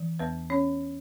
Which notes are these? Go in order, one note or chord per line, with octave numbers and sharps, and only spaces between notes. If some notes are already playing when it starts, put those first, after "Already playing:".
Already playing: E3
E2 B3 B4
C#4 C#5